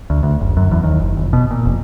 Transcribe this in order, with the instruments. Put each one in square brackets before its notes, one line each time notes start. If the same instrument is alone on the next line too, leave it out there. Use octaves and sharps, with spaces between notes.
[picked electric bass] D2
D2
F#1
F#2
E2
D#2
F#1
F1
B2
A#2
F1